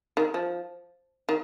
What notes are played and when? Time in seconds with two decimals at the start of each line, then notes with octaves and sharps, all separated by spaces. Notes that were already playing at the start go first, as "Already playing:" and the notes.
0.17 D#3
0.34 F3
1.29 D#3